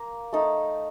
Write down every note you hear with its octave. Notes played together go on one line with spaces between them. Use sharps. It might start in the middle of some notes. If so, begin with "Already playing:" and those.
Already playing: A#3 A#5
A3 D#4